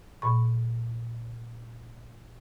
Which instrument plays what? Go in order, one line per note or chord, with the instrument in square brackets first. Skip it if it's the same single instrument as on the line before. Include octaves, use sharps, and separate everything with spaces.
[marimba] A#2 C#6